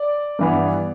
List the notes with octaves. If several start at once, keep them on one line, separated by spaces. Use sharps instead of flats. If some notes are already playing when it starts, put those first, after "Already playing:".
Already playing: D5
G2 E3 B3